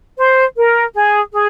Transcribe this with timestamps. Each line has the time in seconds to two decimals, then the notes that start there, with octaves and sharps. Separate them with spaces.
0.18 C5
0.57 A#4
0.94 G#4
1.33 G#4